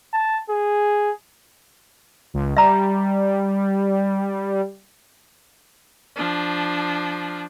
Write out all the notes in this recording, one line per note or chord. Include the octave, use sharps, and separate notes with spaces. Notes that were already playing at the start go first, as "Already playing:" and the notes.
A5
G#4
C#2
G3 E5 A#5
F3 D4